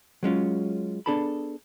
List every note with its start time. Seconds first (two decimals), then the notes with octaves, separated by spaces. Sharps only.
0.23 F#3 G#3 C#4 F4
1.06 B3 D4 G#4 A4 A5 B5